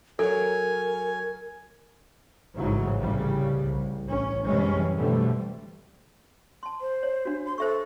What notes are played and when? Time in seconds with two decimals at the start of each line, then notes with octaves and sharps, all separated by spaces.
0.19 F#3 A4 A#4 C#5 G#5
2.56 A1 G#2 C#3 E3 F#3
2.98 C2 C#3 G3
3.67 C2
4.07 A1 C#4
4.46 F#2 C3 E3 G3 G#3 C#4
4.96 B2 D3 E3 G3 A3 C4
6.63 A5 C6
6.81 C5
7.03 C#5
7.25 D4 F#4
7.46 C6
7.58 A4 C5 E5 C#6